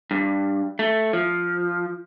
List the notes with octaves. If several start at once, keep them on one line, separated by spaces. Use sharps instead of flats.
G2
A3
F3